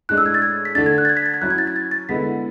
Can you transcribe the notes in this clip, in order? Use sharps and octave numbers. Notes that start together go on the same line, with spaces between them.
A2 G#3 D4 F#6
E6
G#6
A6
G#6
B6
D3 A3 D4 A6
G#6
F#6
A6
G#6
B6
A6
G#6
F#3 C#4 E4 F#6
G#6
A6
G#6
A6
A6
D3 G#3 B3 E4 B6